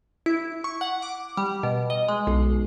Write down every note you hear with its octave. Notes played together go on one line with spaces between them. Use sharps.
E4
C#6
F#5
D6
G3
B2
D#5
G#3
B1